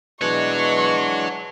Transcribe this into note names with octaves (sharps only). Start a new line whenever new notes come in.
B2 E3 G#3 D4 C#5 F#5 C#6